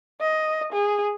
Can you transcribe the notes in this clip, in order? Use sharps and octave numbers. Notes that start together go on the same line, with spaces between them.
D#5
G#4